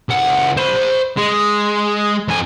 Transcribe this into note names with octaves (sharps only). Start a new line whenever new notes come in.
C#2 F#5
C5 B5
G#3
F2 G#5